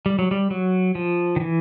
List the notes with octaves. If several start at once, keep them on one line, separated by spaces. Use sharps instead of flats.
G3
F#3
G3
F#3
F3
D#3
E3